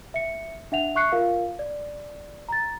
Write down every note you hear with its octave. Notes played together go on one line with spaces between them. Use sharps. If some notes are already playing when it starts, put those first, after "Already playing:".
E5 C#7
D4 E5 F#5 F7
E5 C#6 F#6 C7 C#7
F4 A#4 F5
D5
A#5 A6